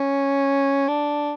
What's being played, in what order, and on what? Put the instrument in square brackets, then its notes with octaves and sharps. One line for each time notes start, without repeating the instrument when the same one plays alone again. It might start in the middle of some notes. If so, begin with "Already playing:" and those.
Already playing: [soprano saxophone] C#4
D4